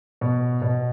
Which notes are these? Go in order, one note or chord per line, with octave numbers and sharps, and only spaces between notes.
B2
B2